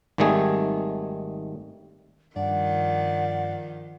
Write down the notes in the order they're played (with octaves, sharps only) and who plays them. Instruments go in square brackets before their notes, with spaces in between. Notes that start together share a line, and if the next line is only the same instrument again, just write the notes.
[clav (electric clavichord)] G#1 D#3 G3 A3 G#4
[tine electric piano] G2 [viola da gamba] D#3 F3 [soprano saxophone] D5 [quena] F#5